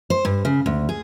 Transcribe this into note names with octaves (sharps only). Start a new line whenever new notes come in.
C5
G2
C#3
D2
G#4